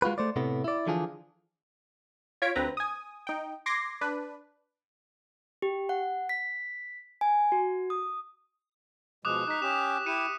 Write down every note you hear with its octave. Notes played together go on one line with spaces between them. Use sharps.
G#3 F4 F#4 B4
A3 C5 D5
A2 C3 A3 B3
E4 D5
D3 E3 F3 D4 F4 G#4
F4 C#5 G#6 B6 D7
D2 C4 B4 A#5
G#5 D#6
D#4 G5
C6 D6 G#6 A#6 C7
D4 B4
G4
F#5
B6
G#5
F#4
D#6
B2 F3 G#3 D6 D#6 F#6
D#4 F#6 B6
C#4 G4 D6 E7
E4 G4 C#7 D#7